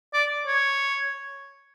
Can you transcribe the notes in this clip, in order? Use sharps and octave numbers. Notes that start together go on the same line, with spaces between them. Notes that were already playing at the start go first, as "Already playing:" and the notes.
D5
C#5